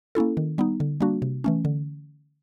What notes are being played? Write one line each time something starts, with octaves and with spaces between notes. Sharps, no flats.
A#3 C#4 E4 A4
D#3
G3 B3 D#4
D3
G3 A#3 D4 F#4
C3
E3 A3 C#4
D3